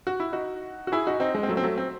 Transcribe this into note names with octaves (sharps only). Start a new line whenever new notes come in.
F#4
E4
D#4 F#4
F#4
E4 G#4
D#4 F#4
C4 D#4
G#3
C4
F#3 A3
C4
F#3 A3
C4